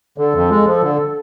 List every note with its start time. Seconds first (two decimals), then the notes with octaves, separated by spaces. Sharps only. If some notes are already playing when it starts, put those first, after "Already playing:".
0.18 D3 A4
0.34 F2
0.50 G#3
0.67 F3
0.82 D3